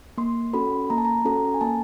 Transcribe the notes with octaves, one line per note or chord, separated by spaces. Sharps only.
A#3 C6
C#4 F#4 A4 B5
A#3 A#5
A5
A#5
C#4 F#4 A4 A#5
G#5
A#3 A5